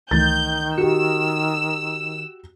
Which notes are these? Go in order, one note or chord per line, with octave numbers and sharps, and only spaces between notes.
C#2 D#3 E3 A3 G6 A6
F#4 G4 E6 C#7